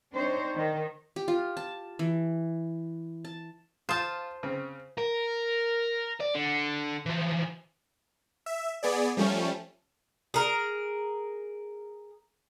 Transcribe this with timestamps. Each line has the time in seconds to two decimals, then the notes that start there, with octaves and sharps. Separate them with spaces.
0.13 C4 D4 D#4 C5 C#5
0.56 D#3
1.16 G4
1.28 F4
1.57 A5
1.99 E3
3.25 A5
3.89 F4 C5 A5 D#6
4.43 C#3 C4
4.98 A#4
6.20 D5
6.35 D3
7.06 E3 F3
8.46 E5
8.83 B3 G#4 D5
9.17 F3 G3 A3 C#4
10.34 G#4 A#4